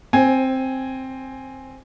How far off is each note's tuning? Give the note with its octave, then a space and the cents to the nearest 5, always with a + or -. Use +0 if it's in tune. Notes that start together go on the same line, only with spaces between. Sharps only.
C4 +5 C5 +35 G#5 +0